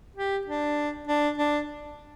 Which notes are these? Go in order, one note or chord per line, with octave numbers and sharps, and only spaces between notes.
G4
D4
D4
D4